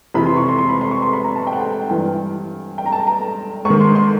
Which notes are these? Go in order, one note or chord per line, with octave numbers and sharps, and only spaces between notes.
F2 C3 E3 B5
C6
C#6
C6
C6
B5
C6
C#6
C6
B5
A#5
A5
G5
F#5
G5
G2 E3 G5
G5
A#5
A5
A#5
G#2 C#6
D#3
C6
C6